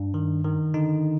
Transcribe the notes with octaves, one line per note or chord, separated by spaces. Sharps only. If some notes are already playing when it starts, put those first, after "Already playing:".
Already playing: G2 D4
D#3
D#3
D3 D#4